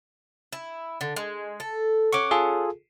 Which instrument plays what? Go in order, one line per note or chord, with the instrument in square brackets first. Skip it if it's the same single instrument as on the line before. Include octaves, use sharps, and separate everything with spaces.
[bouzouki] E4
D3
G#3
A4
[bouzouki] C#4 F#5 [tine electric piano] C#6 D6
[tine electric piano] F4 G#4 A4